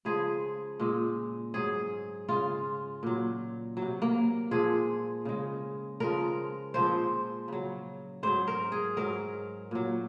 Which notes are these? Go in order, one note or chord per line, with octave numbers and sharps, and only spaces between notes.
C#3 F3 G#3 G#4
A#2 G#3
G#2 F#3 G#4
C#3 G#3 F4
A#2 F#3
F#3
C3
A#3
A#2 F3 G#3 G#4
C#3 G#3
C#3 F3 G#3 A#4
A#2 F3 G#3 C5
C#3 F#3
G#2 F#3 C5
A#4
G#4
G#2 F#3 A#4
A#2 F#3